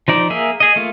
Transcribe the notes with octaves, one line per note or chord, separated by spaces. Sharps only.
F3 D#4 D5
A#3 G#4 E5
G#4 D#5
A3 A#3 F4